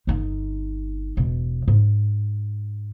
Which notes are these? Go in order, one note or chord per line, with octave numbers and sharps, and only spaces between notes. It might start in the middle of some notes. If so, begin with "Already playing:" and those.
G1 D#4
E1 B2
G#2